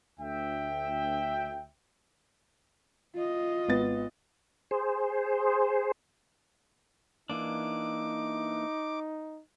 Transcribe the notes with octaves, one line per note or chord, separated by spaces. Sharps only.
D2 E5 G5
F4 D#5
G#1 B3 A6
G#4 C5
E3 A#3 D4 D#4 D6